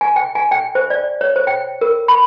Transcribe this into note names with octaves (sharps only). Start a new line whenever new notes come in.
G#5
G5
G#5
G5
C5
D5
C#5
C5
G5
A#4
B5